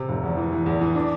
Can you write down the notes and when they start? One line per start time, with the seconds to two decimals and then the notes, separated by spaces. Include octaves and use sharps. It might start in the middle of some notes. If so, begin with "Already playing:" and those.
Already playing: C3
0.08 F1
0.23 E2
0.37 E3
0.52 E3
0.66 E2
0.81 E3
0.95 D4